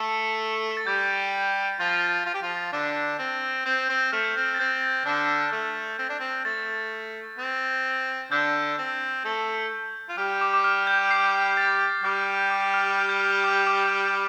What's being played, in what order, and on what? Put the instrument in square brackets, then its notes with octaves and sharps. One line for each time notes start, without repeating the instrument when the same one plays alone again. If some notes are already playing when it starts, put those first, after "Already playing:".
Already playing: [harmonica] A3 A4
[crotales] A6
[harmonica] G3 G4 [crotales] G6
[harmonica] F3 F4 [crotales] A6
[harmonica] F4
G4
F3 F4
D3 D4
C4
[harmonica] C4 [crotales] G6
[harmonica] C4
[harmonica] A3 [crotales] F6
[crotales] G6
[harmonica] C4 [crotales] F6
[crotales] A6
[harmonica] C4 [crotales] G6
[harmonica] D3 D4
A3
C4
D4
C4
[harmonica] A3 [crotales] A6
[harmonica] C4
[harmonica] D3 D4 [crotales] G6
[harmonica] C4
A3 A4
F4
[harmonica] G3 G4 [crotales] F6
[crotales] D6
D6
F6
G6
C7
A6
[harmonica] G3 G4 [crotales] F6
[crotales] F6
D6
F6
F6
G6
F6
D6
D6